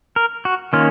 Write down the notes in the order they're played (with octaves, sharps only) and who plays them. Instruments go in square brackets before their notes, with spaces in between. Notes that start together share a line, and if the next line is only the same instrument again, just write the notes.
[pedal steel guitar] A#4
F#4
D#3 A#3 C#4 F4